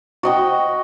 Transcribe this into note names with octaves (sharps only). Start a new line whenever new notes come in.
F#4 D#5 G5